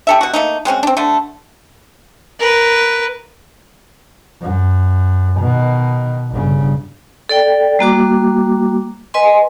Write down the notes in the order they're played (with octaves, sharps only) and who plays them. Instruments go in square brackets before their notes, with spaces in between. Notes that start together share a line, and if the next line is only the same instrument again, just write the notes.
[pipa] G4 A4 E5
B2 F#4
A3 A#3 D#4
G#3 C4 C#4 F#4
C4 D4
D3 A3
[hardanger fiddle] A#4 B4
[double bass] F#2
B2 D#3
G1 C#3
[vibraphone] A4 D5 G5
G3 A#3 F#4 D6
B4 D#5 G#5 C6